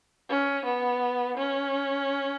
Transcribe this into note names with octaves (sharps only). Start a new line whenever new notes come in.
C#4
B3
C#4